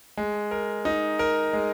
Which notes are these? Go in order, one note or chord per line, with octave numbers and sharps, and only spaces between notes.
G#3
A#4
D#4
A#4
G#3